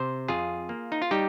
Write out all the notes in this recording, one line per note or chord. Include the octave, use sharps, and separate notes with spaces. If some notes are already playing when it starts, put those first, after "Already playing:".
Already playing: C3 C5
F2 F4 G#4
A#3
D#4
F4
G3 D#4 G4